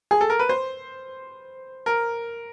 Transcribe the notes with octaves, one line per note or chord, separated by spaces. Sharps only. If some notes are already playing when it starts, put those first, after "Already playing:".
G#4
A4
A#4
B4
C5
A#4